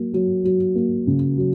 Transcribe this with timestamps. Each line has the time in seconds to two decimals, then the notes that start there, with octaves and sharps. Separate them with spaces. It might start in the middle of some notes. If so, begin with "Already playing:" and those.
Already playing: F#3 A#3
0.14 F#3
0.44 F#3
0.75 A#3
1.07 C#3
1.38 F#3